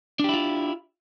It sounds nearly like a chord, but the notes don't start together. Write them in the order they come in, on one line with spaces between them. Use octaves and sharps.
D4 G4 E4 F4